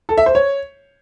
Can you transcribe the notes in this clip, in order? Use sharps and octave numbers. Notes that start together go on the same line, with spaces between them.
A4
E5
C5
C#5